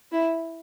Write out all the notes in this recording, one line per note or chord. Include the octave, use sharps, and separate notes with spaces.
E4